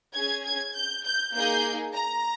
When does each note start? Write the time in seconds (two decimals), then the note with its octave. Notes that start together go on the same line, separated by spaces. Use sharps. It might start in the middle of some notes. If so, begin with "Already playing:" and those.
0.14 C#4 G#4 G#6
0.45 G#6
0.75 G6
1.04 G6
1.35 A#3 D#4 G#4 G6
1.95 A#5